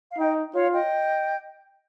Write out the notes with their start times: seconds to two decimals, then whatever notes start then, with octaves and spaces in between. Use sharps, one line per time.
0.12 F5
0.18 D#4 D#5 G5
0.54 F4 C#5 F5
0.73 D#5 G5